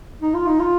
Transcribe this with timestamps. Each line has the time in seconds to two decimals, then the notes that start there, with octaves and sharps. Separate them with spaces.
0.22 D#4
0.34 F4
0.47 D#4
0.60 F4